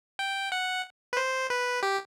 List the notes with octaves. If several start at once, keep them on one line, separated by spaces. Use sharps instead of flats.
G5
F#5
B4
C5
B4
G4